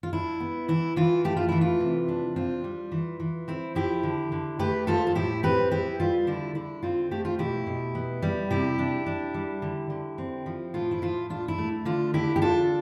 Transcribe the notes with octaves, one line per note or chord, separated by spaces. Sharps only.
F4
D4 E4
B3
E3 E4
E3 F4
A3 G4
F4
E3 E4
F4
C3
D4
C4 F4
G3
E3
E3
C4 E4
F3 E4 G4
D3
D3
A3 G4 B4
F3 F4 A4
A4
A2 E4 G4
C4 G4 B4
B3 E4 G4
G3 F4
D3 E4
D3 E4
C4 F4
A3 G4
F4
B2 E4 G4
B2
B3
G3
C3 E4 G4
D4
D4
G3
D3
D3
C4
F3
A2 F4
E4
A2 F4
D4 F4
E4
A3
D3 F4
D3 E4 G4
G4
D4 F4 A4